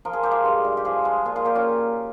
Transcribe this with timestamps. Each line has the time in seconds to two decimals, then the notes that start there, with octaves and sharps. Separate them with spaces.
0.05 F3 A#4
0.13 G#4
0.23 G#3 G4
0.31 F4 G#4
0.45 G2
0.64 G2
0.77 G4
0.85 F3 F4 G#4
1.05 G#3
1.25 A#2 F4 G#4
1.36 F4 G#4
1.45 A#2 G4 A#4
1.55 C#4 F4